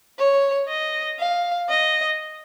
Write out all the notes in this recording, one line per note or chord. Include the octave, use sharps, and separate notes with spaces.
C#5
D#5
F5
D#5